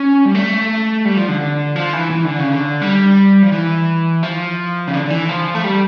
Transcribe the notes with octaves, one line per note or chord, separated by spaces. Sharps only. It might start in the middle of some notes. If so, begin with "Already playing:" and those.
Already playing: C#4
G3
A3
G3
F3
D3
D3
F3
E3
E3
D3
C#3
D3
G3
F3
E3
F3
C#3
D3
D3
E3
F3
A3
G3